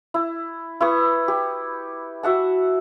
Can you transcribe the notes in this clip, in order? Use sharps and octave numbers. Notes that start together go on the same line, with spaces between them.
E4
E4 B4 C#6 D#6
G4
F#4 E5 F#5 A5